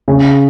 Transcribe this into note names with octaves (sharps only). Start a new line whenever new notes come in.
C#3